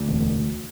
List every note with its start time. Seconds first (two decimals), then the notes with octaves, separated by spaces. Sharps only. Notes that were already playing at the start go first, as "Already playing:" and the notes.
Already playing: D2
0.08 E1